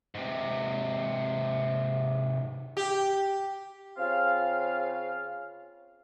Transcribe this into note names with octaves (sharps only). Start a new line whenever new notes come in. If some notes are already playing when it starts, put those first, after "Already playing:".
G#2 C3
G4
C#3 C4 F4 F5